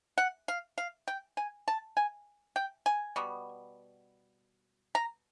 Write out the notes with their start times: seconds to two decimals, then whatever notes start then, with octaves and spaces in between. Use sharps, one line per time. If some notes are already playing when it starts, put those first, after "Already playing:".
0.18 F#5
0.48 F5
0.78 F5
1.08 G5
1.37 G#5
1.68 A5
1.97 G#5
2.56 G5
2.86 G#5
3.16 B2 G3 B3
4.95 A#5